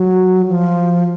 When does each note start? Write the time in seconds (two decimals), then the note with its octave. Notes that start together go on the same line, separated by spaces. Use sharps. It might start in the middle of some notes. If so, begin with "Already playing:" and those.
Already playing: F#3
0.48 F3